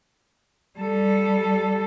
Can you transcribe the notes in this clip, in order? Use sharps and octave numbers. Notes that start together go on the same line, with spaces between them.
G3 A4